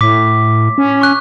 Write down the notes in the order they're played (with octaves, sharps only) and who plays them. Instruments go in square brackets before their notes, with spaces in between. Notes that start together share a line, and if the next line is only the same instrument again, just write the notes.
[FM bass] A2 [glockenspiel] D6 B6
[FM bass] C#4
[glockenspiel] C#6 F#6